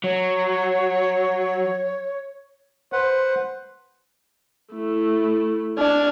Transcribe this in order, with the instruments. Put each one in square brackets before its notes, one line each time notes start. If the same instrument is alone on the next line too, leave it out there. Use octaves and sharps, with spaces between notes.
[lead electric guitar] F#3 [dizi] C#5
[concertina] B4 F#5 [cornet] C5
[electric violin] A3 E4
[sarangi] D4 [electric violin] F6 G#6